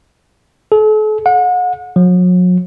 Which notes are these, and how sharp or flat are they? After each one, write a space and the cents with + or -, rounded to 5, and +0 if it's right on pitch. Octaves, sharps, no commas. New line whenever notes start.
A4 -40
F#5 -35
F#3 -40